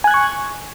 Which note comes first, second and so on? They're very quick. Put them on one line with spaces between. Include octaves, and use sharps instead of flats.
G#5 F#6 G#6 C#6